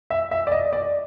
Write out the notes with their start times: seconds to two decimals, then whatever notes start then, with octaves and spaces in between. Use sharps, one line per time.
0.10 E5
0.31 E5
0.47 D5
0.52 D#5
0.73 D5